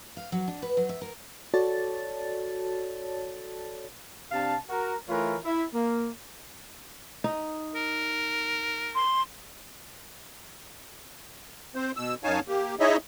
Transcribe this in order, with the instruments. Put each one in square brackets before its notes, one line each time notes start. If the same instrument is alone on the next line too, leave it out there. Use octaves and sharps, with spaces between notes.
[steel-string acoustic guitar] F5
F#3
D4
B4
F#3
E5
A#4
[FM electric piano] F#4 A4 C#5 D5 A5 A6
[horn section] C3 D4 F5 A5
F#4 A#4
E3 A3 F4 A#4 B4 C#5
E4
A#3
[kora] D#4
[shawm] A#4
[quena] C6
[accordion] C4 C5
B2 E6
F#2 D#4 C#5 F5 G#5 A5
A#3 G4
D#4 E4 G#4 C#5 D#5 E5